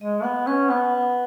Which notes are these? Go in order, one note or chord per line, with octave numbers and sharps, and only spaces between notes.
G#3 D#5
B3 F#5
C#4 B4
B3 B4